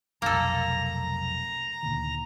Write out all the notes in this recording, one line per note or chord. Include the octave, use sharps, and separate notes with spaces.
F1 B1 F2 A#3 A4 A#5
D2 A#2 D#3